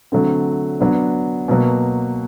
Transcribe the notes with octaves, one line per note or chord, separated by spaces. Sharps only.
D3 F#3 A3 C4
F#3 B3 D4
B2 F#3 A#3